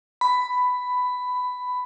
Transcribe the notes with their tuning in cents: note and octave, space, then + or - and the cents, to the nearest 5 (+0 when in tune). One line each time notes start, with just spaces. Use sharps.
B5 +10